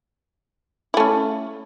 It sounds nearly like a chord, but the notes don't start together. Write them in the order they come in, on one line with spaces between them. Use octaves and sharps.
E4 A3 C#4